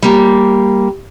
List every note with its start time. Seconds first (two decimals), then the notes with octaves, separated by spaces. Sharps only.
0.02 G3 A#3